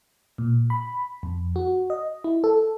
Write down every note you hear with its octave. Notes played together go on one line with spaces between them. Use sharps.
A#2
B5
F2
F#4
D#5
E4
A4